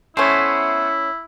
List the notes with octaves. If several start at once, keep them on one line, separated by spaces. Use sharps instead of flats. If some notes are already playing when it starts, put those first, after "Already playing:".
A3 B3 C#4 E4 C5